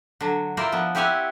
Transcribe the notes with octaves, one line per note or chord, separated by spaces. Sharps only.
D3 F#3
E4 F4 A#4 C5 D5
F3 B3
C4 E4 G4 C#5 F#5 G#5